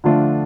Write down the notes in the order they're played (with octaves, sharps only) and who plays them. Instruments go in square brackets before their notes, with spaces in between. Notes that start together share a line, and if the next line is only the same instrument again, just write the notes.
[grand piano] D3 F3 A3 D4 F4